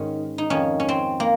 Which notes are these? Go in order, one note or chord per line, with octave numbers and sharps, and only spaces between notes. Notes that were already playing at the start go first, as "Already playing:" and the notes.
Already playing: G#2 D#3 C#4
D#4
F2 D#3 C#4
C#4
C4
A#3